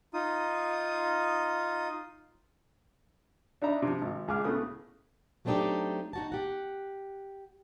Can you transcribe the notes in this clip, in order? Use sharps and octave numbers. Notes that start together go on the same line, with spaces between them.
D#4 F4 D#6
D4 D#4 E5 A#5 B5
C3 F3
G#1
C#2 G#4 F5 D6 F6
A2 C#3 A3 B3 D#6
F#3 A3 C4 D4 D#4 G4
D#4 F#4 A5
G4 F#5